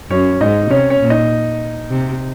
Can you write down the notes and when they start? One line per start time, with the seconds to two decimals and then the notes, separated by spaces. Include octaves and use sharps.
0.10 F#2 C#4 C#5
0.41 G#2 D#4 D#5
0.70 C3 C#4 C#5
0.90 C#4 C#5
1.01 A#2
1.10 D#4 D#5
1.90 C3